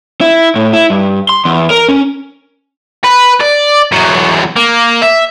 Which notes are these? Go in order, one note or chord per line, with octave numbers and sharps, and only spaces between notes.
E4
A2
E4
G2
C6
E2
A#4
C#4
B4
D5
E2 F#3
A#3
E5